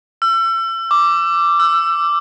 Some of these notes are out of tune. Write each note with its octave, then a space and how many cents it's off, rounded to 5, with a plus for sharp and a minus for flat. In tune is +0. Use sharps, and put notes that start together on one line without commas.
E6 +35
D6 +0
E6 +25